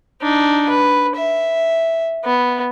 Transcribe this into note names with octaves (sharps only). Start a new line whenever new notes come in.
D4 D#4
B4
E5
B3